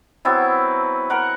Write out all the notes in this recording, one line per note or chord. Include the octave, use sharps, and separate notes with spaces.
F#3 B3 C4 E4
A#4 F#5